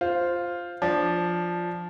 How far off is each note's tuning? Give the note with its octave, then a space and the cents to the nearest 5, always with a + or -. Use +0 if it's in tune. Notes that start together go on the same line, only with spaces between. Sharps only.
F4 +0 C5 +0
F3 +0 D4 +0